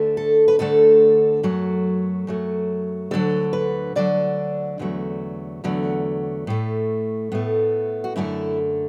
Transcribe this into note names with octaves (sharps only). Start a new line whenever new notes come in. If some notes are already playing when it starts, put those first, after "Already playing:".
Already playing: D2 D3 A3
A4
B4
D2 D3 A3 A4
F#2 F#3 A3
F#2 F#3 A3
D2 D3 F#3 A4
B4
D2 D3 F#3 D5
E2 D3 F#3 A3
E2 D3 F#3 A3
A2 A3
A2 A3 B3
F#4
F#2 D3 A3 E4